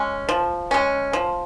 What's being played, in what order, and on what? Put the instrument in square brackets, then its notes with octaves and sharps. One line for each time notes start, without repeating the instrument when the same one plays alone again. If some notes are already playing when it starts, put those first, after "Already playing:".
Already playing: [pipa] G#3 C#4
F3
G#3 C#4
F3